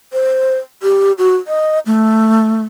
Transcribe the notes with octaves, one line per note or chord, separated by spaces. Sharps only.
C5
G4
F#4
D#5
A3